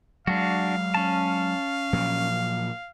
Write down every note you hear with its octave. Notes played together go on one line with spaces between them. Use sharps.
F#3 G#3 D4 F#4 F5
C#4 A5
A#2 F3 F#3